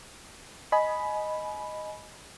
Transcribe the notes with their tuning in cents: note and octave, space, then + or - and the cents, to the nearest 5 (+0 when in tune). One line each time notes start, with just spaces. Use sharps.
D#5 +0 G#5 +25 B5 +0